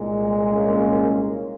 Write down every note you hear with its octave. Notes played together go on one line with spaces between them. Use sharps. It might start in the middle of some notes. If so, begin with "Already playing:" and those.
Already playing: C2 A#2 G#3
A#3 C#4